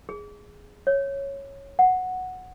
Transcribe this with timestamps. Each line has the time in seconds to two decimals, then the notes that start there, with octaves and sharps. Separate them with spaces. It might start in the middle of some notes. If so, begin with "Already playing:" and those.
0.09 G#4
0.87 C#5
1.79 F#5